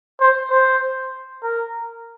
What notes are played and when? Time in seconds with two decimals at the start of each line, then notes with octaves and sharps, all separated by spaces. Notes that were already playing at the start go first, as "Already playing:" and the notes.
0.20 C5
0.50 C5
1.43 A#4